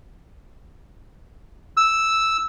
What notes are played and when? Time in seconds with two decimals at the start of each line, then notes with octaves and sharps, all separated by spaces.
1.77 E6